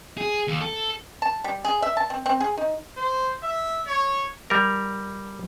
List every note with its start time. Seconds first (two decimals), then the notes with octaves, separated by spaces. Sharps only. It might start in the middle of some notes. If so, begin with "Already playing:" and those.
0.17 G#4
0.48 D#2
0.61 A4
1.22 A5
1.44 G3
1.65 G#4
1.82 E5
1.97 A5
2.10 C4
2.26 C4
2.40 G#4
2.57 D#4
2.97 C5
3.43 E5
3.87 C#5
4.50 G3 A#4